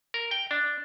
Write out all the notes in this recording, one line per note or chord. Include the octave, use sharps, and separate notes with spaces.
A#4
G5
D4